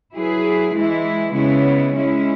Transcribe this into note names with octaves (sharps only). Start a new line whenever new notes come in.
F#3 E4 G#4 B4
E3 G#3 E4
C#3 G#3 B3 E4 C#5
G#3 C#4 E4